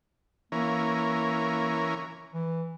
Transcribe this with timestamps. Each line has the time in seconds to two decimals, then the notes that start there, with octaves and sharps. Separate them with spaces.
0.52 E3 A#3 C#4 A#4
2.34 E3